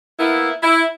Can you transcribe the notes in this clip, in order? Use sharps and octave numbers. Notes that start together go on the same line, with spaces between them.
A#3 B3 E4
E4